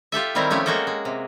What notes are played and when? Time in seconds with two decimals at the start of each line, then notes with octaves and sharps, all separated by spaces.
0.12 F4 G4 A4 E5
0.35 D#3 G3 C4 E4 A#4
0.51 F3 A3 C#4 G4
0.66 G#3 A#3 F#4 A4 G5
0.87 G#3
1.05 C3